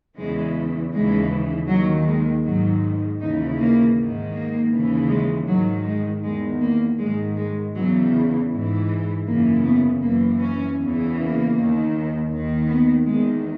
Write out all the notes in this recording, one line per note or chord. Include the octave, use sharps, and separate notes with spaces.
E2 C#3 E3 G#3
D#2 C#3 E3 G#3
D#2 D#3 F#3
G#3
G#2 D#3 F#3
D#2 C#3 E3 D#4
A#3
G#2 D#3
A#3
D#2 C#3 E3
G#3
G#2 D#3 F#3
G#3
E2 D#3 G#3
A#3
G#2 D#3 G#3
G#3
E2 C#3 E3 F#3
G#2 E3
F#2 C#3 E3 A#3
B3
F#2 E3 A#3
C#4
E2 C#3 E3
A#3
D#2 D#3
D#2 D#3
B3
E2 D#3 G#3